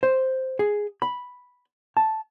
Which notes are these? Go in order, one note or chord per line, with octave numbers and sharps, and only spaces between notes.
C5
G#4
B5
A5